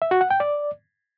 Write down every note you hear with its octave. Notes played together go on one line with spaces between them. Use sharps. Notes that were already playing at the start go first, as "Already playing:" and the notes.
E5
F#4
F#5
G5
D5